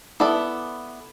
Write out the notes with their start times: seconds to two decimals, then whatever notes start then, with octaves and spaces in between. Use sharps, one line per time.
0.20 B3 E4 A4 D5